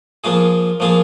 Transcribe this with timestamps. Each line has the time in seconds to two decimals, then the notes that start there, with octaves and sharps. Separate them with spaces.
0.24 F3 A#3 F4 G#4
0.80 F3 A#3 F4 G#4